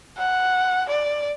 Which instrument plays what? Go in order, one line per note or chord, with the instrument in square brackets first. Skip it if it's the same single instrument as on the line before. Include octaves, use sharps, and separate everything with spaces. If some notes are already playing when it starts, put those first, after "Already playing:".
[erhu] F#5
D5